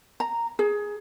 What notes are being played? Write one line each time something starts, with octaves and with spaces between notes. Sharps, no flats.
A#5
G#4